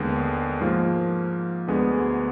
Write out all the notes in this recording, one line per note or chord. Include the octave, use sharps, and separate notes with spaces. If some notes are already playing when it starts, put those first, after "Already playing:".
Already playing: D#2 D3 G#3 B3
G#2 F3 A#3
D2 D3 G#3 B3